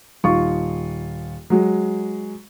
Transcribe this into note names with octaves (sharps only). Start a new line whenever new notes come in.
D#1 D#4 F4 C#6
F#3 G#3